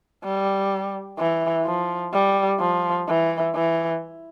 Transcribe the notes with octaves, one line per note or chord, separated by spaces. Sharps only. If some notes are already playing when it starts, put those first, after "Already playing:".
G3
E3
F3
G3
F3
E3
E3